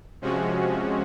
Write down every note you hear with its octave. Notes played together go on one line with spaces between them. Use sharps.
C3 F3 G#3 C#4 F#4